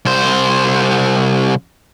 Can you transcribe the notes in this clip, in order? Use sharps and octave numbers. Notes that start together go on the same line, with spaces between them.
C2 C5